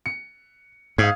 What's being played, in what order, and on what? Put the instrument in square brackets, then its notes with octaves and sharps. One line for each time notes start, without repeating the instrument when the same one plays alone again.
[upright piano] C#7
[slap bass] G#2 [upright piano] F5 D#6 G#6